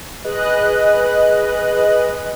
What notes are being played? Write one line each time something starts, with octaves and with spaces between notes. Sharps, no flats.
G#4 B4 D#5 F#6